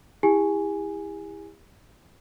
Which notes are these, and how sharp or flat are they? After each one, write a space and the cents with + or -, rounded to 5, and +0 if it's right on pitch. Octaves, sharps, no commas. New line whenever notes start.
E4 -10 G4 +45 G#5 +0